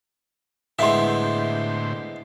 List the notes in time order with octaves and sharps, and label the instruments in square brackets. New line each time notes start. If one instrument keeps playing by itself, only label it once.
[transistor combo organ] A2 D3 C5 [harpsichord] G#3 B3 E4 [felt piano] E5 C6